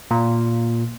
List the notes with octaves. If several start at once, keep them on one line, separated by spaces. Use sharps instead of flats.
A#2